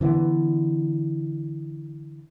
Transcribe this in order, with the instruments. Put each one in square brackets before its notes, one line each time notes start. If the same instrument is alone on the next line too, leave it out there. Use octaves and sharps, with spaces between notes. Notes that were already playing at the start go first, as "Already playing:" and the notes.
[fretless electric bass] D3 E3 G3 B3